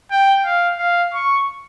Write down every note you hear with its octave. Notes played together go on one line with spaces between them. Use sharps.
G5
F5
F5
C#6